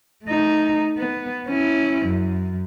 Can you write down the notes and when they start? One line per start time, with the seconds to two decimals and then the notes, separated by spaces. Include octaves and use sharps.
0.25 A3 D#4
0.98 B3
1.47 C#4 E4
2.06 F#2